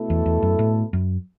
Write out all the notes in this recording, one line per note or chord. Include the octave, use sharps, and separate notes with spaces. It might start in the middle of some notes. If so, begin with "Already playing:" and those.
Already playing: B2 A3 E4 A4
E2
E2
F#2
A2
F#2